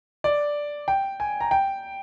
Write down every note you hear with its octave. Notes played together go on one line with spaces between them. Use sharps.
D5
G5
G#5
A#5
G5